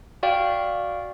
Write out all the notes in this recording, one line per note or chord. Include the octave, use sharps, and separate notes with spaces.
F#4 D5 F5 G5